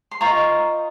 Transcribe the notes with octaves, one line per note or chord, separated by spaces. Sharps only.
C6
F4 C5 D#5 A#5 C#6